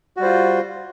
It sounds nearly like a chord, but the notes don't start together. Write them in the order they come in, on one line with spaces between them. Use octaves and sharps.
F#4 G3 C5 F4